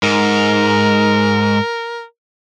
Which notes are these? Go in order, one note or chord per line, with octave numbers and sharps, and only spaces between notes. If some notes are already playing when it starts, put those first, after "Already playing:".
G#2 A#4